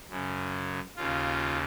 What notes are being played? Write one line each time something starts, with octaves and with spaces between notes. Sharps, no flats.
F#2 C#3
D#2 C#3 F4